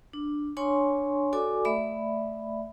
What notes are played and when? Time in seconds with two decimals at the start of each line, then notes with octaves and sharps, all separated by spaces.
0.13 D4
0.57 D4 C#5 G#5 C6 C#6
1.33 F#4 A4 D5 G#5 D6
1.65 A3 D5 E5 B5